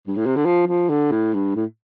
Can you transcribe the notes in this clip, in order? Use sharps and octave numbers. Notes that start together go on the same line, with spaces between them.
G2
A2
C3
D3
F3
F3
D3
A2
G2
A2